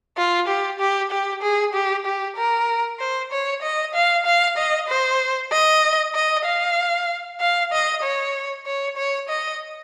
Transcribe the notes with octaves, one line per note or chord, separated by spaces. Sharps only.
F4
G4
G4
G4
G#4
G4
G4
A#4
C5
C#5
D#5
F5
F5
D#5
C5
D#5
D#5
F5
F5
D#5
C#5
C#5
C#5
D#5